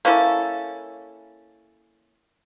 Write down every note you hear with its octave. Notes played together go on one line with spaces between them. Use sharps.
A#3 C#4 E4 A4